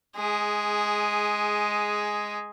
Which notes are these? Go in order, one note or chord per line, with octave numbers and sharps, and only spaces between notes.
G#3 G#4